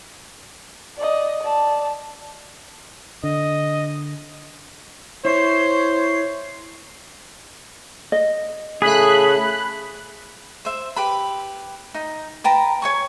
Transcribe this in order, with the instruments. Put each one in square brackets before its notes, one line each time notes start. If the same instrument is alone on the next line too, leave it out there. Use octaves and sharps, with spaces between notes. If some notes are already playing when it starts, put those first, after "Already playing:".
[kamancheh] D5 D#5
D5 A5
[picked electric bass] D3 [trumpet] D#5
[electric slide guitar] E4 [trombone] C5 [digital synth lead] C#5 [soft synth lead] C7
[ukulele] D#5
[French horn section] A2 C#3 A3 [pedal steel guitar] G#4 [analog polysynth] B5 F#6
[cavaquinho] C5 E5
G4 B4 B5
D#4
B4 G5 A5 A#5
C#5 G#5 C#6